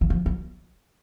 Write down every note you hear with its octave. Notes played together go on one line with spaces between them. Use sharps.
E3
F3
F#3